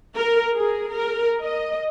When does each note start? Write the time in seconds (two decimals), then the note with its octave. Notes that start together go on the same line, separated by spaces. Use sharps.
0.16 A#4
0.56 G#4
0.91 A#4
1.42 D#5